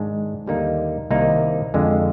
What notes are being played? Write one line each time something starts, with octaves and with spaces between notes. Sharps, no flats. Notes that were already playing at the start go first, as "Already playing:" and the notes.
Already playing: G#2 D#3 G#3 D4
D#2 D3 G3 A#3 D#4
C2 C3 D#3 A#3 D#4
F2 D3 G#3